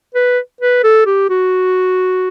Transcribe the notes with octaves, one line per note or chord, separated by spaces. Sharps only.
B4
B4
A4
G4
F#4